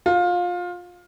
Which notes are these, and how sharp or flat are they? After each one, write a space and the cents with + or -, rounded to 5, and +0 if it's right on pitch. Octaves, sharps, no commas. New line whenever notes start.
F4 +20